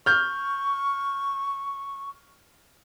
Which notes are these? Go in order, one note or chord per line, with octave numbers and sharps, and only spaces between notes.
C#6 F6 G6